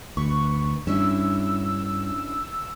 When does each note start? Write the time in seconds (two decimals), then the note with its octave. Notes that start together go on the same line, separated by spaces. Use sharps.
0.17 D2 B4 C#6
0.87 G2 C#4 D4 E4 E6